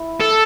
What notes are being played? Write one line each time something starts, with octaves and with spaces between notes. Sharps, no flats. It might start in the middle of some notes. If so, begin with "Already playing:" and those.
Already playing: E4
A4